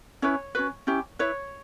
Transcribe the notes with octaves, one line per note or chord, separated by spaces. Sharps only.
C#4 E4 B4 C#5
C#4 F#4 B4
C#4 E4 G4
E4 B4 C#5